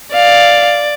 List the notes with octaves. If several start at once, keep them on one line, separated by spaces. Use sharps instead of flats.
D5 F5